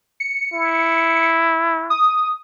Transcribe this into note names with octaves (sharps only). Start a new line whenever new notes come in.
C#7
E4
D#6